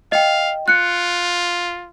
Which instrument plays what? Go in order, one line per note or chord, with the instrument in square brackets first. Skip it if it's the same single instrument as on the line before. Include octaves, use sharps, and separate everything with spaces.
[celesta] D#5 G5 [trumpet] F5
[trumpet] F4 [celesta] F#6 C#7